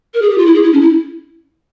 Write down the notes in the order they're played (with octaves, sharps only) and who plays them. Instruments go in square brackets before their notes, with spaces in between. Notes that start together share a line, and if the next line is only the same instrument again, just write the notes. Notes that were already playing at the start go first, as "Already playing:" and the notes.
[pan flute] A#4
G#4
G4
F4
E4
G#4
E4
C#4
E4